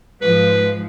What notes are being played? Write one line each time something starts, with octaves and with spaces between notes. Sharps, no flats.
G#2 F3 G#3 B4